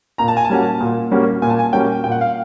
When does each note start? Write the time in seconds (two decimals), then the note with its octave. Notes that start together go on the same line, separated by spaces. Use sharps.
0.18 A#2 A#5
0.28 A5
0.37 G#5
0.45 A5
0.50 G3 A#3 C#4 F#4
0.81 A#2
1.11 G3 A#3 C#4 F#4
1.42 A#2 G#5
1.50 A5
1.59 G#5
1.73 G3 A#3 C#4 F#4 G5
2.04 A#2 G5
2.12 F#5
2.21 F5